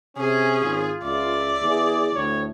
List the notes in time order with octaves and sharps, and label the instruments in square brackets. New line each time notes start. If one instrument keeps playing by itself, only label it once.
[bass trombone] C3 [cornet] C#4 [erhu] G#4
[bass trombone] G#1 [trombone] F4
[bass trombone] C#2 [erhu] D5 [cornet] E5
[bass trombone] E2 [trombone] G#4
[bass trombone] D2 [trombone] A2 [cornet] C#5